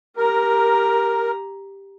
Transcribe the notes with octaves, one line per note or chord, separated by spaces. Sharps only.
G4 A#4 A#5